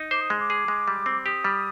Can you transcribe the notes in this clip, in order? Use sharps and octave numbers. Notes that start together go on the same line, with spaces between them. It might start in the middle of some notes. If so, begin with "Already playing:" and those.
Already playing: D#4
C5 D6
D#6
G#3
D6
G#4
G#3
G3
C4
G4 D#6
G3